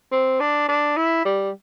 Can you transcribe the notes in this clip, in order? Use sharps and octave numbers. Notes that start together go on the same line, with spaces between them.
C4
D4
D4
E4
G3